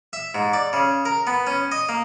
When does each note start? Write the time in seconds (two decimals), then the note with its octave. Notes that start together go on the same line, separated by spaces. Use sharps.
0.13 E5
0.35 G#2
0.53 D5
0.73 C#3
1.05 A#4
1.27 B3
1.47 C#4
1.72 D#5
1.89 A#3